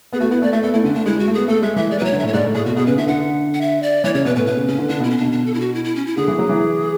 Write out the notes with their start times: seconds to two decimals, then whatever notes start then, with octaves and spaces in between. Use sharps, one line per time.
0.13 B3 G#4
0.20 A3 F#4
0.31 B3 E4
0.42 A3 D5
0.53 A3 E5
0.63 B3 A4
0.74 A3 E4
0.84 D3 C#4
0.95 A3 D4
1.06 G#3 E4
1.16 G#3
1.19 F#4
1.27 A3
1.34 B3 G#4
1.48 A3 A4
1.62 G#3 E5
1.76 E3 E5
1.91 G#3 D5
1.99 F#3 B4
2.05 C#5
2.12 D3
2.19 A2 E5
2.28 C#5
2.33 G#2 D5
2.44 A2
2.55 A2 G#4
2.65 B2 F#4
2.76 B2 G#4
2.86 C#3 B4
2.98 D3 E5
3.08 D3 F#5
3.54 F#5
3.61 E5
3.83 D5
4.04 E3 C#5
4.14 C#3 C#5
4.25 B2 B4
4.36 A2 B4
4.47 B2 B4
4.57 C#3
4.68 C#3 C#4
4.78 D3
4.89 D3 D4
5.00 B2
5.04 E4
5.10 C#4
5.17 B2 D4
5.32 D4
5.46 A4
5.54 E4
5.60 F#4
5.74 E4
5.85 E4
5.96 C#4
6.07 E4
6.17 D3 G#4
6.28 E3
6.39 F#3
6.49 E3